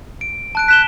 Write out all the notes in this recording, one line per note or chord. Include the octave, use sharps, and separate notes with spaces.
D7
A5 F#6 D7
F#6 B6 E7 G7